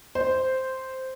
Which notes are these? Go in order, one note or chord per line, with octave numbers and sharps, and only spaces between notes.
C5